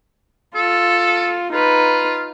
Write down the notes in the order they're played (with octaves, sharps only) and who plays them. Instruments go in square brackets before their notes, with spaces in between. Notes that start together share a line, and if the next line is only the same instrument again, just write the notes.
[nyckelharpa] F4 [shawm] A4
[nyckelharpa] D#4 B4 [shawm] F4